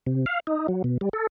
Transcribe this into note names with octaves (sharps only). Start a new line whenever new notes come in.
C3
F5
D#4
F#3
B2
G3
A4